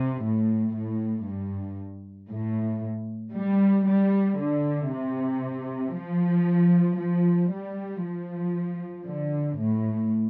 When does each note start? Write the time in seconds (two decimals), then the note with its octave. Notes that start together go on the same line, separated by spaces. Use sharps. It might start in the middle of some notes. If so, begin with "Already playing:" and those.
Already playing: C3
0.23 A2
0.74 A2
1.26 G2
2.30 A2
3.34 G3
3.86 G3
4.38 D3
4.91 C3
5.95 F3
6.98 F3
7.51 G3
8.03 F3
9.07 D3
9.59 A2